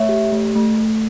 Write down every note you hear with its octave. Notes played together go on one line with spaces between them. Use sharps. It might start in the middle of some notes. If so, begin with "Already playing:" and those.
Already playing: A3 C#5 E5
G4
A3
A3
A3